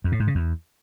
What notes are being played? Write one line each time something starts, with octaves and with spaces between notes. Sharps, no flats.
F2
A2
G#2
C#3
E2